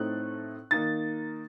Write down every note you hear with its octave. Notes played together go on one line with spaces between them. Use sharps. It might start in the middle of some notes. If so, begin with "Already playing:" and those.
Already playing: A2 A3 C4 D#4 F#6
D#3 A#3 D#4 A6